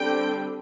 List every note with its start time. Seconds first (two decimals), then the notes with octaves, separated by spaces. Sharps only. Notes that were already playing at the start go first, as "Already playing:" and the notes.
Already playing: D3 G3 C4 G5